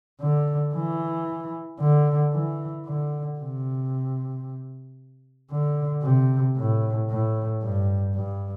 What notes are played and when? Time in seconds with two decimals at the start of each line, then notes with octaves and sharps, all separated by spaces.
0.21 D3
0.75 E3
1.80 D3
2.33 E3
2.86 D3
3.39 C3
5.51 D3
6.03 C3
6.57 A2
7.09 A2
7.62 G2
8.15 G2